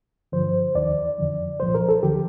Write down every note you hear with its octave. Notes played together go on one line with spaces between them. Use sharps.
G2 D3 F3 C5
D#2 D#3 D5
F2 D3 F3
C2 A#2 F3 C5
A#4
A4
D2 D3 F3 G4